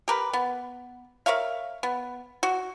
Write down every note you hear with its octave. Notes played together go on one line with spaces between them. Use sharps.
G4 A#4 B4
B3
A#4 C#5 E5 F5
B3
F#4